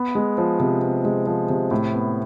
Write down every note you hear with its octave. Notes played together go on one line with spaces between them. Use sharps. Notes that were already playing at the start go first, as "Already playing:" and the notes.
Already playing: B3
G#3
F3
C3
B3
G#3
F3
C3
A2
B3